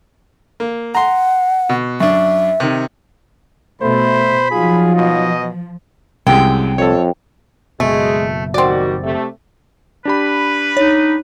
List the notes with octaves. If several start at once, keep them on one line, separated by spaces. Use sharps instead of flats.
A#3
F#5 A#5 C6
B2
F#2 D4 E5
C3 D#3
B2 A3 C5 B5
F3 F#3 D#4 F4 G#4
B2 D#5
C2 F#2 C3 G#3 G5
F2 A4 C#5
F#1 B2 G#3 A3
D#3 G3 C4 F#4 D5
C3 A3
D4 G4 B4 B5
D#4 C#5